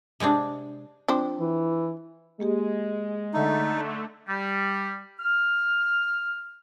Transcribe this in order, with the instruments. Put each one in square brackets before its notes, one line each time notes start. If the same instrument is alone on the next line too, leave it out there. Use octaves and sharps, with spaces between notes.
[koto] C3 G#3 C4 D4
[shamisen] F3 C4 D4
[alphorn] E3
[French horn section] G#3 [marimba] A#3 G4 G#4
[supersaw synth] D3 A3 [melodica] D#4
[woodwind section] G3
F6